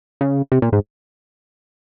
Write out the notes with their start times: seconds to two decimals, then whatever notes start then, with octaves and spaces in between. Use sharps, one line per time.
0.21 C#3
0.52 C3
0.62 A#2
0.72 G#2